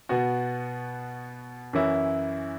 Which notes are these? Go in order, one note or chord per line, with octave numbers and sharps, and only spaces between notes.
B2 B3 F#4
F#2 E3 C#4 E4